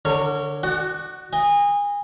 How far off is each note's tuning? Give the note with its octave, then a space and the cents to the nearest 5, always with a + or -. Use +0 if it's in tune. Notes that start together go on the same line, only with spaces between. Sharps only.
D3 +0 A#4 -35 C#5 +0
F#4 +0 D5 +30 F#5 +25
D#5 +0 G#5 -30